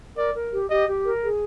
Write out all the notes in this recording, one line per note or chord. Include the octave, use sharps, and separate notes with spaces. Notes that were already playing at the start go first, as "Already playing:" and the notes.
A#4 D5
A#4
G4
G4 D#5
G4
A#4
G#4